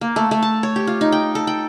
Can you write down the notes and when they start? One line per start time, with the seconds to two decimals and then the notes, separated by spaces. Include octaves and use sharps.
0.01 A#3
0.16 A3
0.31 A3
0.43 A5
0.63 C#5
0.76 G4
0.87 F4
1.01 D#4
1.12 G5
1.35 A4
1.47 G5